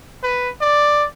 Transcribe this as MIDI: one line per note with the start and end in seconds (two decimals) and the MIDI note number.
0.23 0.50 71
0.61 1.05 74